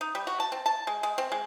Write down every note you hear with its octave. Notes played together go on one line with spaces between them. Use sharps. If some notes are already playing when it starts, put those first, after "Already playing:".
D#4
G3
F#4
A5
C4
A5
G#3
G#3
C4
G#3